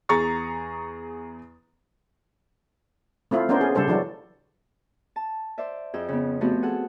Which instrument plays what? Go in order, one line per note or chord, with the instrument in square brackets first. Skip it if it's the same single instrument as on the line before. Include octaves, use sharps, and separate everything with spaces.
[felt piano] E2 G#4 A#5 C#6 A6
[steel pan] A3 C4 E4 F4
B3 C#4 D4 A#4 C5
G#4
C#3 G3 D4 A4 C5
E3 F#3 D4 F#4
[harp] A5
C5 D5 E5
F2 G#4 G5 E6
C#3 B3
F3 A3 B3 C4 F#4 G4
G#4 A4 F#5 G#5